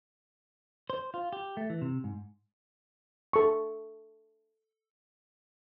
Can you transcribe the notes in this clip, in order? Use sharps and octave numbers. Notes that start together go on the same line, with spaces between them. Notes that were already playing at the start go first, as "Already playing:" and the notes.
C5
F4
G4
A3
E3
C3
G#2
A4 C#6